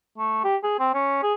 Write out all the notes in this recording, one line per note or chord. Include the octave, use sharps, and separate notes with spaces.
A3
G4
G#4
C4
C#4
G#4